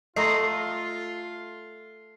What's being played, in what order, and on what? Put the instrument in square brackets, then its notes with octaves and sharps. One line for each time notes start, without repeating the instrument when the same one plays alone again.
[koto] A3 [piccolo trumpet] F4 [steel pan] D#5 A#5 C6 [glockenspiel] C7